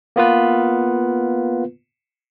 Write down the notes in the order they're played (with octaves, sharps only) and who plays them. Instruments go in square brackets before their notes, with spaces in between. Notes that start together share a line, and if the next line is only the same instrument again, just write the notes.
[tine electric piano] A#3 B3 F4 B4